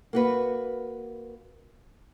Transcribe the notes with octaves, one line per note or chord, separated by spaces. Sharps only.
A#3 F#4 B4